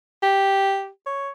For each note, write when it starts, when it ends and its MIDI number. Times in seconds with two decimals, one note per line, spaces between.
0.23 0.89 67
1.06 1.31 73